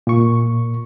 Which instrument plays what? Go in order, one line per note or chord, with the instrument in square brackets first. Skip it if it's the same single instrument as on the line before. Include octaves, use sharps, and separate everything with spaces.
[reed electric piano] A#2 C#6